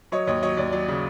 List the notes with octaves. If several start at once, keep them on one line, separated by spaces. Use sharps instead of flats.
F#3 C#5 D#5
D#2 C#5 D#5
F#3 C#5 D#5
D#2 D5
F#3 D5
C#3